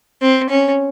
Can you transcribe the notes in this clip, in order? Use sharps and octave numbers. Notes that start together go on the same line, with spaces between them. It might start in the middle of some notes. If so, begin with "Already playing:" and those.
C4
C#4